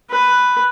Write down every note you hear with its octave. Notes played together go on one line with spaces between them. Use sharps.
B4